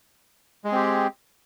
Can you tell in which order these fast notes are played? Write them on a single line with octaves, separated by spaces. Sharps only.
G#3 G#4 C4 G4